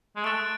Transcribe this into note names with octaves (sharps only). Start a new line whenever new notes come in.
G#3
A3 F#6 A6 D7